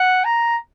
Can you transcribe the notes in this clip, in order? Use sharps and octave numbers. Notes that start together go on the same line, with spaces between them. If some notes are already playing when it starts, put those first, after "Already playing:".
Already playing: F#5
A#5